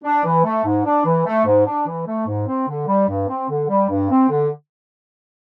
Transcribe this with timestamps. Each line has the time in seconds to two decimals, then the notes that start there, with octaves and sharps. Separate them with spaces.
0.04 D4
0.25 E3
0.44 A3
0.65 G#2
0.85 D4
1.05 E3
1.26 A3
1.46 G#2
1.66 D4
1.87 E3
2.07 A3
2.27 G#2
2.48 C4
2.68 D3
2.87 G3
3.08 G2
3.29 C4
3.49 D3
3.69 G3
3.90 G2
4.10 C4
4.30 D3